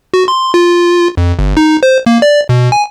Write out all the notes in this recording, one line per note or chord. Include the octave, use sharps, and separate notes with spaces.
F#4
C6
F4
F2
G1
D#4
C5
A#3
D5
B2
G#5